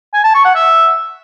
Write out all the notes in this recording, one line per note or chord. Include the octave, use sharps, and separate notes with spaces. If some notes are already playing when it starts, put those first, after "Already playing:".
G#5
A5
C#6
F#5
E5